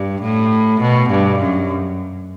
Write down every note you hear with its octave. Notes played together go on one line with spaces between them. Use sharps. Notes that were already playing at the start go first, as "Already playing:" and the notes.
Already playing: G2
A2
B2
G2
F#2